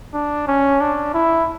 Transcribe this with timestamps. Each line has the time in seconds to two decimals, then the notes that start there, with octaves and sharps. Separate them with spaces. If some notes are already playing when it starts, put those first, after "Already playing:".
0.14 D4
0.48 C#4
0.81 D4
1.14 E4